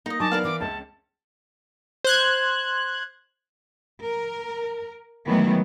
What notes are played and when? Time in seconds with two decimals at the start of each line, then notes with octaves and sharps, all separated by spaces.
0.06 A#3 D#4 D#5
0.20 D#3 F#3 D4 G#5 A5 C#6 D6
0.31 B3 A#4 D5 F5
0.45 E3 D6
0.60 C#2 C#4 E5 A5
2.04 C5 F#6 G#6
4.03 A#4
5.27 D#3 E3 F#3 G#3 A3 B3